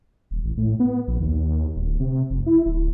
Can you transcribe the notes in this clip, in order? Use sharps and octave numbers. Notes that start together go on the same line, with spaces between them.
D#1
A1
A2
B3
A#1
D#2
D1
C3
F1
E4
D1